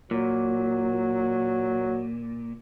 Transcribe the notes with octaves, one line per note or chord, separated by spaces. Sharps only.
A#2 F#3